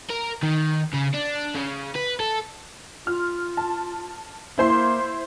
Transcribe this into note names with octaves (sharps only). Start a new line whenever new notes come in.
A#4
D#3
C#3
D4
C#3
B4
A4
F4 F6
A5
A#3 E4 C5 C6